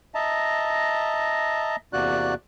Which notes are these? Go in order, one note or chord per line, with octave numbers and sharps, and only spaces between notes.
D#5 E5 A5 A#5
E2 C3 A#3 F#4 D5 F#6